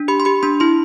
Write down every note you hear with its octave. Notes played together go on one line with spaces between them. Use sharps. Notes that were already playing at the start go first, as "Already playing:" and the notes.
Already playing: D4
G4 B5
C6
G4 B5
D4 C6
E4 C6